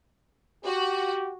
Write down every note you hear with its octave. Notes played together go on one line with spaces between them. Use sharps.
F#4 G4